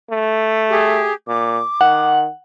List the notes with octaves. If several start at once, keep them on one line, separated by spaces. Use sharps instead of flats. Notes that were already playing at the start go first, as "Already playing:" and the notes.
A3
G4 G#4
A#2 D6
D#3 F#5